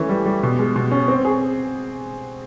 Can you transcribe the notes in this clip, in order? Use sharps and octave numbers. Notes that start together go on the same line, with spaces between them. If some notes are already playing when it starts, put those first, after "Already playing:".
Already playing: E3 A3 C#4
G3
G3
B2
G#3
B2
C#4
C4
G#4